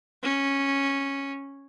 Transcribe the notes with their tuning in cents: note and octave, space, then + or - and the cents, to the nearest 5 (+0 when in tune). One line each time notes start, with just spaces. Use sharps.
C#4 -5